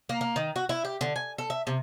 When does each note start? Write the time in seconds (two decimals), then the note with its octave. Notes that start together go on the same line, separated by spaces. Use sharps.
0.09 A#3
0.21 A#3
0.36 D#3
0.56 F#4
0.69 E4
0.85 G4
1.01 D3
1.16 G#5
1.38 A4
1.50 E5
1.67 C3